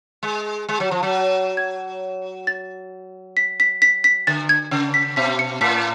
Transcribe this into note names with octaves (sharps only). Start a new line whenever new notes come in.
G#3
G#3
F#3
F3
F#3
G#6
A6
B6
B6
B6
B6
D3 A6
G#6
C#3
B6
B2 B6
C#7
A2 B6